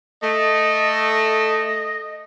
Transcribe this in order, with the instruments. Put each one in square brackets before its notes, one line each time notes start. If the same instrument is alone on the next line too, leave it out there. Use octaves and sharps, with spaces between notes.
[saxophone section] A3 [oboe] D#5